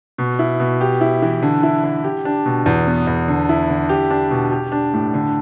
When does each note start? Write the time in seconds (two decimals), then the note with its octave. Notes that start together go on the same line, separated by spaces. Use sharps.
0.18 B2
0.39 E4
0.60 B2
0.81 G4
1.01 E4
1.22 E3
1.42 D3
1.63 E4
1.83 D3
2.04 G4
2.25 D4
2.46 B2
2.66 E2
2.87 B3
3.07 E2
3.28 D3
3.49 E4
3.70 D3
3.89 G4
4.11 D4
4.31 B2
4.52 G4
4.72 D4
4.94 A2
5.14 D3